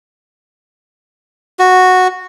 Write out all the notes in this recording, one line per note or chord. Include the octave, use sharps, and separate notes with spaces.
F#4